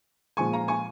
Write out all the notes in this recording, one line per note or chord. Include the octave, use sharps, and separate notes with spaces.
A#2 F3 G#3 G#5 C#6
F5 A#5
G#5 C#6